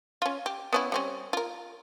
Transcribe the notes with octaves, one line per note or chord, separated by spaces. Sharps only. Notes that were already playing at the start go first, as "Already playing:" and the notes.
C#4 F4
G4
B3 C#4 E4
G3 C4 C#4
F4 A#4